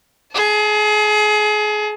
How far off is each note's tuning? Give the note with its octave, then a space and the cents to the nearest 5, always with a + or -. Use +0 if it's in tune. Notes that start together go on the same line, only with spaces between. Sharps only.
G#4 +30 A5 +0